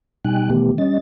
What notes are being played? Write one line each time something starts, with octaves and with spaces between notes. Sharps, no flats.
B2 G3 D#4 G5 G#5 F#6
B2 D#3 E3 A3 B3 G4
G3 C#4 D#5 A6